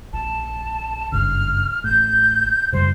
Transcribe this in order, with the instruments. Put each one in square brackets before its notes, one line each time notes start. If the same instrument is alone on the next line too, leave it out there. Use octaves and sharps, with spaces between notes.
[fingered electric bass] A#1 [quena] A5
[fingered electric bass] F#1 G2 C#3 [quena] F6
[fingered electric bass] A1 A2 [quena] G6
[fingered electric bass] F#2 C#3 G3 [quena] C5